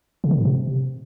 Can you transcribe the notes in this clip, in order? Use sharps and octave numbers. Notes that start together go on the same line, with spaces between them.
C#3
D3
A2
C3